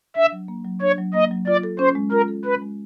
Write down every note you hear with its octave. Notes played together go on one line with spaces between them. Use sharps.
D4 E5
F#3
A#3
F#3
D4 C#5
F#3
A#3 D#5
F#3
F4 D5
A4
C#4 C5
G#3
F4 A#4
A4
C#4 B4
G#3